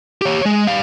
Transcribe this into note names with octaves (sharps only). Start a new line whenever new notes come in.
G4 C#5
G#3
G3 F5